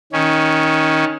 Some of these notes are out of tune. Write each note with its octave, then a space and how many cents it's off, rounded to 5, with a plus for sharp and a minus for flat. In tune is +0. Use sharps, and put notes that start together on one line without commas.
D#3 +15 C#4 +0